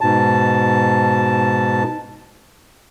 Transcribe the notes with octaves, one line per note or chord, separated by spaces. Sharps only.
G#2 B2 A5